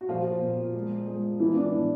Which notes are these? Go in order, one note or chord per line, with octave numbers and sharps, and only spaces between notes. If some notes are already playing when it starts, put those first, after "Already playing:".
F#4
A#2 F3 F4
A#2
G#3
G#3
E3 B3 E4
D4
A2 E3 E4